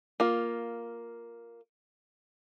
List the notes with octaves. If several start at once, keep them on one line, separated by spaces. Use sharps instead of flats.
A#3 F4